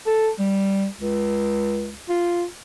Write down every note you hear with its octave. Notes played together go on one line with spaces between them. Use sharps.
A4
G3
C#2
F4